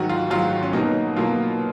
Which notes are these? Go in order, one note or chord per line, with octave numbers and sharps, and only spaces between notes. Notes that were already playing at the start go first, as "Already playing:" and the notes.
Already playing: G#2 D#3 F#3 F#4
F4
G#2 D#3 F#3 F4
C#4
B2 F#3 A#3 D#4
B2 F#3 A#3 F4